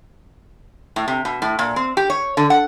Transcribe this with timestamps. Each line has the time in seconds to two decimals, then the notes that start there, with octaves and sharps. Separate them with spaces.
0.96 A2
1.08 C3
1.25 B2
1.42 A2
1.59 A#2
1.76 C4
1.97 G4
2.10 C#5
2.37 D3
2.50 F#5